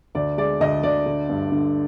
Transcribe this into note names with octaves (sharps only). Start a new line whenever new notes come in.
D2 D5
G#3 D5
D2 D#5
D2 D5
D3
G2
D3